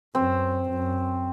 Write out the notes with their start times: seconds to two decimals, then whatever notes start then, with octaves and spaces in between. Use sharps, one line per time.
0.15 F#2 C4
0.70 F#2